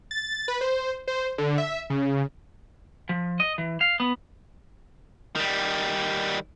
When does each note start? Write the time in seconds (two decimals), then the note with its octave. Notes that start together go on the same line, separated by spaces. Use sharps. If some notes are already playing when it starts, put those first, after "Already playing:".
0.11 A6
0.48 B4
0.61 C5
1.08 C5
1.38 D3
1.58 E5
1.90 C#3
3.09 F3
3.40 D#5
3.58 E3
3.81 F5
4.00 B3
5.36 D#3 G3